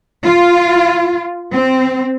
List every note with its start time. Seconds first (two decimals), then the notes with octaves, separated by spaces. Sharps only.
0.23 F4
1.52 C4